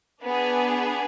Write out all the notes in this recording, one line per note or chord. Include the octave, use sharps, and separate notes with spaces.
B3 D4 G#4 B4